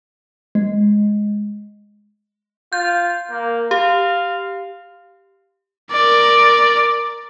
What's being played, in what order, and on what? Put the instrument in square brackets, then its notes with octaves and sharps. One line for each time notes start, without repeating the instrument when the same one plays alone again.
[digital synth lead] G#3
[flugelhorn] F4 [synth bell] G6
[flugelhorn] A#3
[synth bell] G4 [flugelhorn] F5
[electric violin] A#4 D5